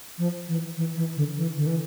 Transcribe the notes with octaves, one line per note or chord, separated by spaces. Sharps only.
F3
E3
E3
E3
D3
E3
D3
E3